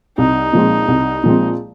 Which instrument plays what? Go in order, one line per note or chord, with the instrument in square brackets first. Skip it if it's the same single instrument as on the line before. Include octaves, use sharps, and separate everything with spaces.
[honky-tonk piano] C2 [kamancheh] D#4
[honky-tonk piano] A#2 F3 G#3 C4
C2
A#2 F3 G#3 C4